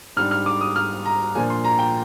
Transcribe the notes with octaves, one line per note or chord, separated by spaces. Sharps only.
G#2 G3 D4 F6
F6
D6
D#6
F6
A#5
A#2 F3 A#3 D4 G#5
C6
A#5
G5